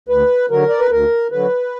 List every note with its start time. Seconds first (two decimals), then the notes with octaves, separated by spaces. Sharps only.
0.08 D2 B4
0.50 D3 F#3 A#4
0.69 D5
0.79 B4
0.90 D2 A#4
1.32 D3 F#3 B4